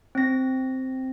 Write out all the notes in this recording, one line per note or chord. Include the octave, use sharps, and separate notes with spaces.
C4 A#6